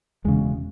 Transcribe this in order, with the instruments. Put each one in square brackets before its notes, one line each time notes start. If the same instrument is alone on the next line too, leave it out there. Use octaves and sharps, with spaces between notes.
[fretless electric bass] E1 E2 C#3 G#3